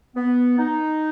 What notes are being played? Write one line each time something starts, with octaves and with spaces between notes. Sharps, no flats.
B3
D#4